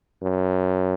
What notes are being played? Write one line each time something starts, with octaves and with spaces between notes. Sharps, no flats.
F#2